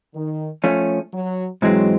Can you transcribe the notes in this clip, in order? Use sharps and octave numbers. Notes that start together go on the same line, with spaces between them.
D#3
F3 A3 C#4
F#3
G#2 E3 F#3 G#3 C4